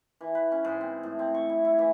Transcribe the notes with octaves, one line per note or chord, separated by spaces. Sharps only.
E3
B4
C#4
G#2
C4
A2
C4
C#6
E4
E4
E3